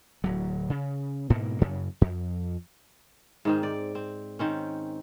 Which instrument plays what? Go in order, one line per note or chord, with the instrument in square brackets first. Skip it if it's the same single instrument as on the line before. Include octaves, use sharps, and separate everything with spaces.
[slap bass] D1 F#3
C#3
G#2 B2 A#3
F#2 C#3
F2
[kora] G#2 D#3 C4
D5
C4
D#3 C4 C#4